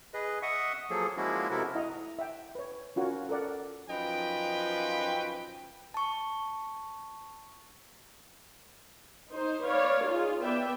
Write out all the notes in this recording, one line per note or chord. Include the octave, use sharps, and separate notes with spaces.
G#4 B4 D#5
D#5 E5 F#5 C#6 D#6
F3 F#3 A#3 G#4 A4
F3 G#3 A#3 C#4 E4 F#4
C3 G#3 E4 F#4 A4 A#4
E4 D#5 F#5 A#5
E5 F#5 G5
B4 C#5
C#4 F4 F#4 A#4 C#5
A4 A#4 D5 F#5
F#2 F3 D#4 B4 G5
A5 C#6
D#4 C5
B4 C#5 D5 F5
D#4 F4 G#4
B3 B4 D5 E5 G5